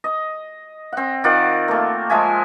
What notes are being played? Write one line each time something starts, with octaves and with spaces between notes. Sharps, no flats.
D#5
C4 F#5
D#3 F4 D5 F#5
A3 A#3
F3 G#3 E5 G#5